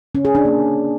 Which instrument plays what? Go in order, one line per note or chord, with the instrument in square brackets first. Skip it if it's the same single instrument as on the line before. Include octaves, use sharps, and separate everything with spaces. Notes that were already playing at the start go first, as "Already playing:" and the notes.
[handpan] C#4
G#4
D4
A#3